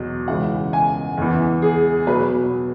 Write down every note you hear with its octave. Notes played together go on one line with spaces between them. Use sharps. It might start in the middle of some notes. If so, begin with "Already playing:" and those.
Already playing: E2 B2 F#3
C#2 C#3 E3 F#5
G#5
E2 E3
G#4
B2 F#3 B4